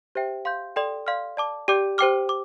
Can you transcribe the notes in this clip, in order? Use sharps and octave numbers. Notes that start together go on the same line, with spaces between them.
G4 C5 E5 G5
F5 C6 G6
A4 D5 G5 C6
D5 F5 C6 F6
D5 A5 D6
G4 D5 G5 D6 G6
G4 C5 G5 D6 F6
D6